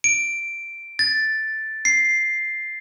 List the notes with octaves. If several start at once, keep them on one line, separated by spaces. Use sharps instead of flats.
D7
A6
C7